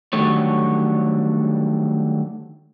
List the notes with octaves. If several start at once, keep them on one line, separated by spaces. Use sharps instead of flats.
D3 D#3 F#3 G3 A3 C#5